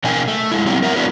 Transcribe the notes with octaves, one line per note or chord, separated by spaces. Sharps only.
B2 C#4 D#4 A#4 G5 G#5
A3
G#3 E4
F#3 A3 B3 C4 D#4 G4
A#4 E5 F#5
B3 C#4 D4 E4 F#4 B4